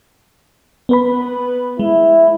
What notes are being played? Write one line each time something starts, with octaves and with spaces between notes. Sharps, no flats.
B3 B4 B5
G#3 E4